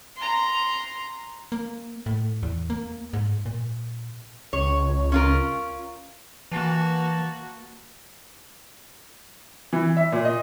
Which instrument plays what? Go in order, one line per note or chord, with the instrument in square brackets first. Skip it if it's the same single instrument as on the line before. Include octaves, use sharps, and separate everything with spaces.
[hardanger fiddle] A#5 C6
[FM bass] A#3
A2
E2
A#3
G#2
A#2
[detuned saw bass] C#2 [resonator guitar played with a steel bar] C#5
[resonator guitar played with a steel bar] C#4 F4 A#4
[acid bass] E3 [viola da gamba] A#3 F#4 [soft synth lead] A5
[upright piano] E3
E5
A#2
D#5